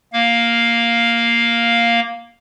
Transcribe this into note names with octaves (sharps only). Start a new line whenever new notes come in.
A#3 F5